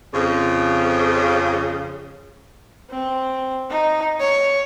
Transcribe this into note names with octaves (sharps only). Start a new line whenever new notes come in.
F2 C#3
C4
D#4
C#5